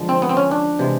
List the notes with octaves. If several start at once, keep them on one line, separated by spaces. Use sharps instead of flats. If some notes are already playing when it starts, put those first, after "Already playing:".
Already playing: D3 F3 G#3
C4
B3
C4
C#4
D4
C3 E3 G#3